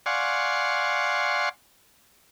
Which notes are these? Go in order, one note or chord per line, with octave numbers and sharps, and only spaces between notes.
D5 F5 F#5 G#5 C6 C#6